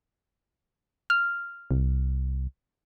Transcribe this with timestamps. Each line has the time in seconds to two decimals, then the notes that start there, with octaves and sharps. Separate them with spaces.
1.10 F6
1.71 C2